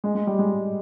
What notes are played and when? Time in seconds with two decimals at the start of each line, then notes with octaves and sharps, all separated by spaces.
0.04 G#3
0.15 G#3
0.27 G3
0.39 G#3